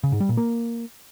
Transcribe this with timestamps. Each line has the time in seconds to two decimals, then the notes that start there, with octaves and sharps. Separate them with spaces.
0.04 C#3
0.12 G#2
0.20 G3
0.29 A#2
0.37 A#3